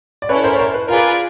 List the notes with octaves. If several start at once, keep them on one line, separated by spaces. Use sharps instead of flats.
D5
C#4 E4 A4 B4 C#5
A#4 C5
C#5
A#4 C5
B4
F4 G#4 A#4 B4 D5